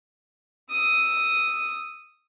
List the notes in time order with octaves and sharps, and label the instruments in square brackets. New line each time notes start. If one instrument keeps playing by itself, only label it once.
[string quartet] D#6 E6